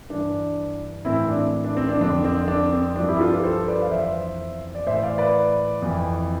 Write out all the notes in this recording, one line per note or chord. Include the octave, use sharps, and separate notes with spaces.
G2 E3 D4
A2 E3 C4 E4
D4
D4
C4
D4
F2 D3 F3 D4
C4
D4
C4
G2 F3 D4
E4 G4
F4 A4
G4 B4
A4 C5
B4 D5
F5
F2 E3 C5 E5
D5
A2 E3 C5 E5
D5 F5
B4 D5
F2 E3